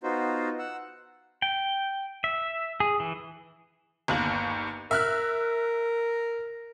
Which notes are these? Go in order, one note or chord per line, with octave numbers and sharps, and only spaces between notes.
B3 D#4 F4 F#4 C5
F#5 E6
G5
E5
G#4
E3
G1 D#2 F#7
A#4 E5 F6 F#6